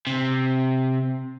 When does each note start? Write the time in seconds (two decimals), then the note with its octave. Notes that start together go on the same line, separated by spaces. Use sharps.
0.07 C3